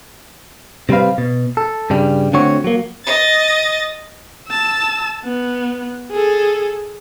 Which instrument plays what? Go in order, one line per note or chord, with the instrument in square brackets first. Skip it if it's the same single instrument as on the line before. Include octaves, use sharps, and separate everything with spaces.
[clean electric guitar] C3 G3 C4 B4 F5
B2
A4
G2 C#3 G3
D3 A3 C4 F#4 C#5
F#3 A#3
[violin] D#5 A6
[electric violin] A5 E6
B3
G#4 A4